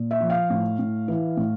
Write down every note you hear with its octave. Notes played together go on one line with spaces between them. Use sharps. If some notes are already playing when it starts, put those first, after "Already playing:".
Already playing: A#2
E5
F3
F5
A2
A2
E3
A2